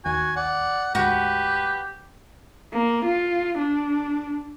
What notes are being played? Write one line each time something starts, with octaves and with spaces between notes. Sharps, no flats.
D1 D#2 F#4 G#5
D5 F#5
D2 G#2 F#4 G4 B4
A#3
F4
D4